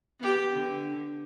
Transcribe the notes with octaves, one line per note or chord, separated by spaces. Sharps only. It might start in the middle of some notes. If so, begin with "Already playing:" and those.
B3 G4
D3